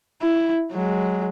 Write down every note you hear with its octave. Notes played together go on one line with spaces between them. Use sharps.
E4
F#3 G#3